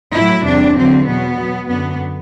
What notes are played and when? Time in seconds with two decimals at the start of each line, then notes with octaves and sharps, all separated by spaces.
0.14 A2 F#3 E4
0.45 E2 C3 G3 D4
0.76 E2 D3 F#3 C4
1.07 B2 F#3 B3
1.39 B2 F#3
1.70 F#2 D3 F#3 B3